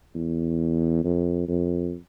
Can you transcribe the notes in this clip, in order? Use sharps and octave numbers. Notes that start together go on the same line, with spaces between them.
E2
F2
F2